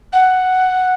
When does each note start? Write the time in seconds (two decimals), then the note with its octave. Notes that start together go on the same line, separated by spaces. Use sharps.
0.12 F#5